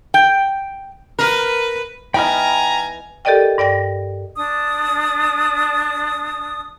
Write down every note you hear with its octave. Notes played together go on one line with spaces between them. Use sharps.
G5
A#4 B4
E3 B3 D#4 G5 G#5 A#5 B5 F6
G4 A4 A#4 D5 D#5 G5
G2 D5 G5 A#6
D4 D#6